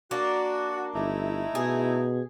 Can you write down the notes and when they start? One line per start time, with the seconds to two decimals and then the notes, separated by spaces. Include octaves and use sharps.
0.11 A#3 D4 F#4
0.95 G1 A3 D#4 E4
1.55 B2 G#4